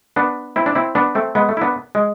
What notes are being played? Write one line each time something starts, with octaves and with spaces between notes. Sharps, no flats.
B3 D4
C4 E4
D4
C4 E4
B3 D4
A3 C4
G#3 B3
A3
E4
B3 D4
G#3